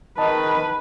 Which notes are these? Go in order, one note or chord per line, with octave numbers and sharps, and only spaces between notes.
D#3 B4 D#5 A5